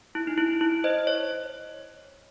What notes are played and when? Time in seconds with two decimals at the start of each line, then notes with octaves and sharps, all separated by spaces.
0.15 E4
0.27 D#4
0.38 E4
0.61 E4
0.84 C5 D#5
1.07 C#5